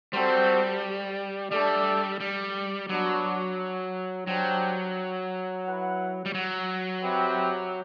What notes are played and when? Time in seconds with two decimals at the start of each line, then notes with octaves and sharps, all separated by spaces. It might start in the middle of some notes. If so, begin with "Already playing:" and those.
0.13 G3 C4 F#4 A4 C5
1.51 G3 A3 D4 A4 D5
2.20 G3
2.89 F#3 B3 D4 F#4
4.27 F#3 D4 G4 C5 G5
5.65 E4 B4 F#5
6.26 G3
6.34 F#3
7.03 C4 G4 B4 E5 G5